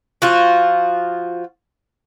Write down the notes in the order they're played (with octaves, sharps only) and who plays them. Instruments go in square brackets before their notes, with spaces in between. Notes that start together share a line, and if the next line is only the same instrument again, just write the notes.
[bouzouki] F3 F4 F#4